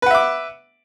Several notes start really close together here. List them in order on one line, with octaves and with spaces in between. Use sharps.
B4 F#5 E5 D6